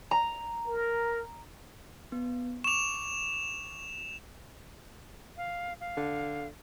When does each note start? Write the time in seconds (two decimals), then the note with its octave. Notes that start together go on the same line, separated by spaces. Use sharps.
0.11 A#5
0.68 A#4
2.12 B3
2.64 C#6 D6 E7 F7
5.37 F5
5.80 F5
5.97 D3